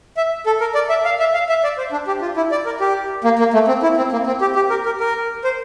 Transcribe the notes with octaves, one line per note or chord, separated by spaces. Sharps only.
E5
A4
A#4
D5
E5
F5
E5
F5
E5
D5
C5
D4
G4
F4
E4
D5
A#4
G4
A#3
A#3
A3
C4
E4
C4
A#3
C4
G4
G4
A#4
A#4
A#4
C5